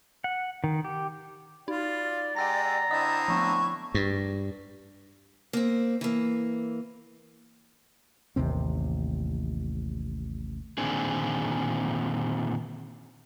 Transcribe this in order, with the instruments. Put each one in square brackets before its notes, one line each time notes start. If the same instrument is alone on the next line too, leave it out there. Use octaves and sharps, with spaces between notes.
[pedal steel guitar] F#5
D#3
G4
[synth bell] D#4 [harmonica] F4 [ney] D5
[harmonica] G#3 G4 [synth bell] F#5 E6 A6 [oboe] A#5
[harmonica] D3 C4 E4 [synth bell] D#5 D#6
[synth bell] F3 A3 B3 [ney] C#6
[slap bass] G2
[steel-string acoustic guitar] A#3 C4
E3 A#3
[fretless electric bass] A1 D#2 C3 C4
[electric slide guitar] A#2 D3 D#3 C4 D4 G#4